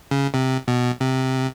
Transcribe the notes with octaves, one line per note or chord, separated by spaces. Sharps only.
C#3
C3
B2
C3